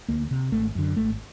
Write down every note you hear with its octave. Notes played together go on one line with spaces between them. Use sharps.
D2 A#3
C3
G#1 A3
F#2 D3
G#1 A3